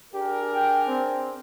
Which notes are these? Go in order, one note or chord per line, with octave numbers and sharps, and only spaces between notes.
D4 G4 G#4 A#4
G5
C4